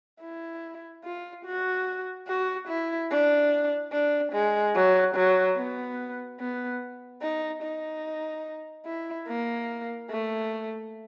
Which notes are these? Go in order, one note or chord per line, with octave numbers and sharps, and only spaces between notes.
E4
F4
F#4
F#4
E4
D4
D4
G#3
F#3
F#3
B3
B3
D#4
D#4
E4
A#3
A3